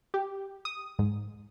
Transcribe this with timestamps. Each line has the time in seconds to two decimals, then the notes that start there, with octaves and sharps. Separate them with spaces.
0.14 G4
0.65 D#6
0.99 G#2